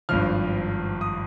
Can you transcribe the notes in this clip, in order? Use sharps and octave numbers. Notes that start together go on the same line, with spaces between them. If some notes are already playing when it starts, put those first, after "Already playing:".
G#1 G2 F3 F6
D#6